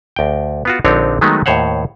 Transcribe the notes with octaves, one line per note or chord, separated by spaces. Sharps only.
D2 G5
B3 F4 F#4
A#1 D3 C4 D4 D#4 C#5
D#3 F#3 G#3 A3 B3 D#4
D#2 A2 C5 C#5 F#5